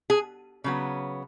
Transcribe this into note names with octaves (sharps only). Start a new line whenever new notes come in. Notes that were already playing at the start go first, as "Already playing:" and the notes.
G#4
C#3 F#3 B3